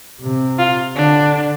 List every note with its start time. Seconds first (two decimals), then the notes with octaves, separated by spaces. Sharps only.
0.20 C3
0.58 F4
0.96 D3 D4